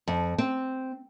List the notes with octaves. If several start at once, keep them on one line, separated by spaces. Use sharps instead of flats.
F2
C4